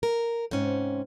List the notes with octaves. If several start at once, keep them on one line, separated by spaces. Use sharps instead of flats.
A#4
G#2 C3 C#4